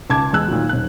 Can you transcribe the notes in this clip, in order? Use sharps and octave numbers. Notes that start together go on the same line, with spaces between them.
C#2 A5 D6 G#6
E2 G#3 E6 F#6
A#2 D#3 F#3
D#1 F#6